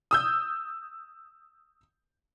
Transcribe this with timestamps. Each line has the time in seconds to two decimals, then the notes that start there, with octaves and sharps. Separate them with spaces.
0.11 D#6 E6 G6